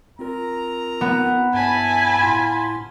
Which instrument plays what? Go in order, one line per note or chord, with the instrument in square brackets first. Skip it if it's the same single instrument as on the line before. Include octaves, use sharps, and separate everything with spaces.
[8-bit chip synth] C4 F4 A#4 [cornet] A#5
[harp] B3
[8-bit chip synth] G2 [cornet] E4 [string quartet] G#5 A5 B5
[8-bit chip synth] A2 E4 C6 [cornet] F4